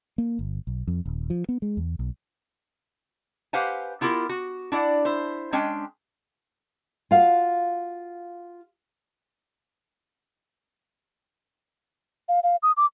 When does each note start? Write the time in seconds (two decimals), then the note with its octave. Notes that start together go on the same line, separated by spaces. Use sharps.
0.18 A#3
0.39 G1
0.67 B1
0.87 F2
1.05 D#1
1.30 F3
1.49 B3
1.62 G#3
1.77 E2
1.99 B1
3.53 G4 B4 C5 F5 F#5 G#5
4.01 B3 E4 F4 G4 A#4
4.29 F#4
4.72 D4 E4 D5 F#5
5.05 E4 C5
5.53 G#3 C#4 D4 G5
7.11 F4 F#4 F5
12.29 F5
12.43 F5
12.63 D#6
12.77 D6